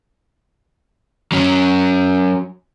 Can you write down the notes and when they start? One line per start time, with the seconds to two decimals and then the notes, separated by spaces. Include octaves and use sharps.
1.32 F#3 C#4